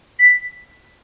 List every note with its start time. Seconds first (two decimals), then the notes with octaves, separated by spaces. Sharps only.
0.19 B6